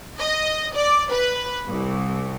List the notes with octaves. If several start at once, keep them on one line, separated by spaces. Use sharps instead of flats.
D#5
D5
B4
C2